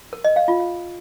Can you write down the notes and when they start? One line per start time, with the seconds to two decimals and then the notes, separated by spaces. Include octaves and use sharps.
0.13 A#4
0.24 D#5
0.36 F5
0.48 F4
0.60 F5